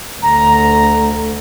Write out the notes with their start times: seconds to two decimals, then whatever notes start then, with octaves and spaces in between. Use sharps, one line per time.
0.22 D2 A#5